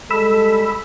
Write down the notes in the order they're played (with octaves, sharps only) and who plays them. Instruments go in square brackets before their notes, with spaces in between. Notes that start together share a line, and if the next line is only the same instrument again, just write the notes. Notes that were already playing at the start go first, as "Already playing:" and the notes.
[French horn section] G3 G#3 A4 [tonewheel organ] B5 E6